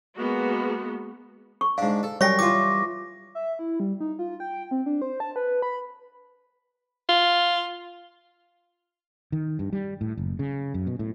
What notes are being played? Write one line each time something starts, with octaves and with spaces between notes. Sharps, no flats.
G#3 A#3 B3 F#4
C#6
G#2 D4 F5
A4
F#2 G3 C#5 G5 G#5 C#6 A#6
E3 F4 D6
E5
E4
G3
D#4
F4
G5
C4
D4
C5
A5
B4
B5
F4
D#3
G2
G3
A2
F#1
C#3
F#2
B2
A2